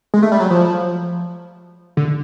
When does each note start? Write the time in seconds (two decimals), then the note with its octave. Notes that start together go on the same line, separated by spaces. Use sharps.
0.14 G#3
0.23 A3
0.32 G3
0.40 F#3
0.50 F3
1.97 D3